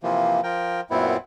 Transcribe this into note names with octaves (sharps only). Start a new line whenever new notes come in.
C3 E3 F3 A#3
F3 A#4 G5
F#2 A#2 B3 C4 E4